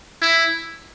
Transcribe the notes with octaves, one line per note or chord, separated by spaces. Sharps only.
E4